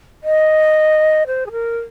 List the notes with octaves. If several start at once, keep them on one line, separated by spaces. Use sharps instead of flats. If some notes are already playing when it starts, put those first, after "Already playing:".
D#5
C5
G#4
A#4